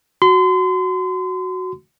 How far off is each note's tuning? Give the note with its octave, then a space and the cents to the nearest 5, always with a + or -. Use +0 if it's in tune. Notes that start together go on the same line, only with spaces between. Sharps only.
F#4 +0 C6 -35